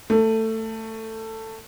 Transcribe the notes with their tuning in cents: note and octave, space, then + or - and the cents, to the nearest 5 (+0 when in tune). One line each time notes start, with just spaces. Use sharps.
A3 +15